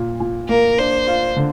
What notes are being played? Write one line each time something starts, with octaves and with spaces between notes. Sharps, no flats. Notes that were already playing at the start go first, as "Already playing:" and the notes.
Already playing: A#2
A#2
A#3 A#4
D4 C5
F4
D3